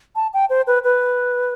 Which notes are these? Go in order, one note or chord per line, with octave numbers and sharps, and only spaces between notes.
A5
G5
C5
B4
B4